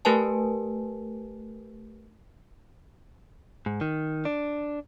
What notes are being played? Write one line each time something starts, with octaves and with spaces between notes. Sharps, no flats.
A3 G4 A#4 B4 G#5 A5
G#2
D#3
D4